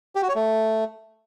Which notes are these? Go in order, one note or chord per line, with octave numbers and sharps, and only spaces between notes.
G4
F#4
C#5
A3